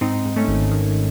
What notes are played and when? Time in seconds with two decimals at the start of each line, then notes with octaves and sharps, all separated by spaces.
0.01 G#2 C4 D#4
0.25 G#2
0.36 A3 C#4
0.48 G#1
0.72 D#3